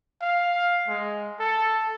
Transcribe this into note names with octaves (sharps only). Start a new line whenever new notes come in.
F5
G#3
A4